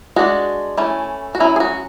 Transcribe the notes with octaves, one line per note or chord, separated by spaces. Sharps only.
G#3 D4 F#4
E3 A3 C#4
F#4
F#3 C#4 E4
G#4
F#4